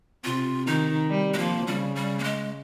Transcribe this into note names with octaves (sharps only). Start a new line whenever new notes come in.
C3 F4
D#3 D#4
G3
G#3
F3 A#3
C#3 G3
G3
A#3
G#3